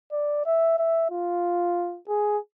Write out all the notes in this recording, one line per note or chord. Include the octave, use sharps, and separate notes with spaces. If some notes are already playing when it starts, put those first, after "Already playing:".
D5
E5
E5
F4
G#4